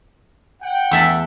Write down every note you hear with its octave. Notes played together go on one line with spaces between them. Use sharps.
F#5 G5
E2 E5 A5